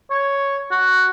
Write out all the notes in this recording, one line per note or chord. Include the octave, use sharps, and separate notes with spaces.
C#5
F#4